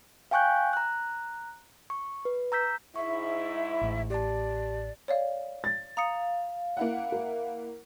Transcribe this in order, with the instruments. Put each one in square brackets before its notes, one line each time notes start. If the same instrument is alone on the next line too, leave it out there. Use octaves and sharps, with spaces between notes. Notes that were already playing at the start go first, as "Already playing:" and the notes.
[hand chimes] F5 G5 G#5 C#6 F#6 G6
A#5 F#6
C#6
B4
A#5 E6 G6 B6
[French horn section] G#2 E4 [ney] E5 [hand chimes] C#6
[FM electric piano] A1 A2
[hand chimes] G4 A5 [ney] D5
[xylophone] C#5 D5 F5
[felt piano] A6
[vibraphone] F5 [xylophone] A#5 D#6 C#7
[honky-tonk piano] A#3 E4 F#5
[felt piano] A#4